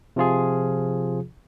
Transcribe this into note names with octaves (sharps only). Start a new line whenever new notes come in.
C3 F3 F4 G#4